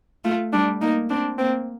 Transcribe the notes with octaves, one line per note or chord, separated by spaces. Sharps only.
A3 F4
G3 D4
A#3 D#4
C4 D4
A#3 C4